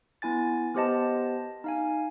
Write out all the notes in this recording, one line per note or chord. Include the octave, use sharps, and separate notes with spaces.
B3 E4 G#5 A6
B3 G4 C5 D#5 A5
D#4 F5 G#5